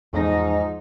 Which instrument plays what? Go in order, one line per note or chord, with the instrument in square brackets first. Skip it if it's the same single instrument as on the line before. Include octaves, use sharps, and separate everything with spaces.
[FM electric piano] E2 A#6 [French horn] G#2 [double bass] F3 D#4